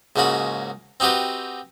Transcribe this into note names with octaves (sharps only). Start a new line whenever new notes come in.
C#2 G#2 C#3 A#3 F#4 B5
C4 D#4 F#4 G4 B4